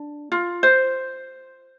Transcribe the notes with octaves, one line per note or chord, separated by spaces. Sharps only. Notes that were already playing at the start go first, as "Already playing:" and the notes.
Already playing: D4
F4
C5